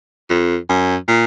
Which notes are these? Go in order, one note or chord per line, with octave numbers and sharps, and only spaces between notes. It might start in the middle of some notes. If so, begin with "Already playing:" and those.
F2
F#2
A#2